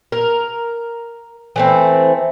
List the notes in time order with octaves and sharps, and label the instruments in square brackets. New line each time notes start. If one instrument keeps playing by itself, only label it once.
[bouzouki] A#4
E3 A3 C4